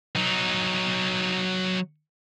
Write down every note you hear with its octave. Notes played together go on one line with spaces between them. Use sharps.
F#3 D#4